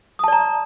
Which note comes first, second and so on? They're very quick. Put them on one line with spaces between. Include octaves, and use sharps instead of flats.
D#6 A5 D5 A#5